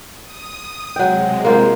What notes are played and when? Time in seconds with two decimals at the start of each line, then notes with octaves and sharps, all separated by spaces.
0.22 D#6
0.96 C3 F#3 G#3 G5
1.45 A#3 F4 C5